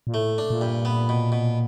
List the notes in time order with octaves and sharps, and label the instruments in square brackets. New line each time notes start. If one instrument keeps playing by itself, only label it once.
[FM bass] A#2
[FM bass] A2 [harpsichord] A3
[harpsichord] D4
[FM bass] A#2
[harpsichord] G2
B3
B2
B2